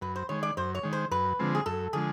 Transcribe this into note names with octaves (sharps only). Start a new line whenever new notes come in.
F#2 B4
C5
D#3 G#3 C#5
D5
F#2 C5
C#5
D#3 G#3
C5
F#2 B4
D3 F3 G#3 C4
G#4
F#2 A4
D3 F3 G#3 G#4